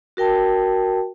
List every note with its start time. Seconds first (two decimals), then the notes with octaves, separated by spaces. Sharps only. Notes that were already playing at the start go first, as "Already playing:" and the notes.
0.17 F#4 A#4 G5 A5